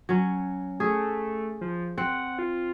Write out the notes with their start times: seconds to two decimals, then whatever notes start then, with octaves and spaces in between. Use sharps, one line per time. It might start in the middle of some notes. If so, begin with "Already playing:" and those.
0.09 F#3 C#4
0.80 A3 G#4
1.61 F3
1.98 C4 F#5
2.39 F4